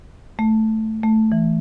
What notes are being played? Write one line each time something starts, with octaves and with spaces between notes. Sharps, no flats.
A3
A3
E3